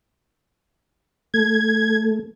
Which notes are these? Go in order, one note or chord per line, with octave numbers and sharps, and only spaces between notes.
A3 G#6